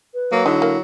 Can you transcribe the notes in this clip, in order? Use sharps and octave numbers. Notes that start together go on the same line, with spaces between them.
B4
F#3 A#3
D3 D#4 E4
A#3